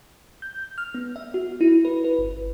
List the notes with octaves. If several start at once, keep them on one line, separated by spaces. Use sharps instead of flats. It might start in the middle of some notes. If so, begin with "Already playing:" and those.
G6
F6
B3
E5
F#4
E4
B4
B4
G1